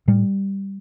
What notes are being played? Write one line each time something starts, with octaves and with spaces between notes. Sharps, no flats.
A2 G3